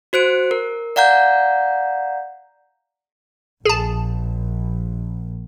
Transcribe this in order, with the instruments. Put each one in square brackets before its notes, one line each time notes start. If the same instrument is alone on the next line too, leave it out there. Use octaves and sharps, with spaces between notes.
[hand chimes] F#4 C5 F#6 D7
A#4
D5 F5 F#5 A#5 G6
[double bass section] A#1 [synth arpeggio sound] G#4 A5